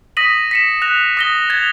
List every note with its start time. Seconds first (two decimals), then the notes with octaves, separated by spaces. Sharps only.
0.17 D#6 A#6 B6 D#7 F#7
0.51 B6 C#7 E7
0.82 F#6 A#6 F7
1.17 D#6 A#6 G7
1.50 G#6 A6 F7 G7